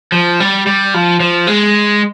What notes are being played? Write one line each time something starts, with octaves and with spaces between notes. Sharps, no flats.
F3
G3
G3
F3
F3
G#3